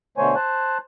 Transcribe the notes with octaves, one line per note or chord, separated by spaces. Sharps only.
B2 D3 A3 C5 C#5 G#5
C5 A5 F#6